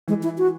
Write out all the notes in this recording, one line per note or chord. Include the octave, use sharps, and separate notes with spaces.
E3 G#3
E4
F#4